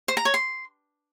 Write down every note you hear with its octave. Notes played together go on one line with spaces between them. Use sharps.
C5
A#5
C#5
C6